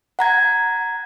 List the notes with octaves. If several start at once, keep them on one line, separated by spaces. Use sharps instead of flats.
F#5 A#5 G#6